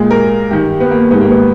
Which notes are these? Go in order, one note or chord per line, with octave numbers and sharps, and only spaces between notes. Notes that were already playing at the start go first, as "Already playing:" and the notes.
Already playing: A#2 G#3
A#4
G2 D#3 G3 G4
B3
A#3
G#2 D#3 G3 B3
A#3
B3